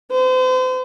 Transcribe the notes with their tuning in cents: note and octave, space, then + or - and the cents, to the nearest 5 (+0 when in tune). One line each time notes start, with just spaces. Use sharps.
C5 -40